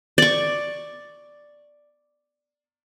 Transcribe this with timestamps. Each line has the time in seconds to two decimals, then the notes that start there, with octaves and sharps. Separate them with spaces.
0.18 D5 C#6